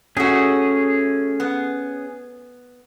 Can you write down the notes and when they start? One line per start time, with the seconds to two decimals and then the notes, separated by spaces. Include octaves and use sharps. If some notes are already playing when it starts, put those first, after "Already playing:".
0.17 A3 C#4 F#4 G#4
1.40 B3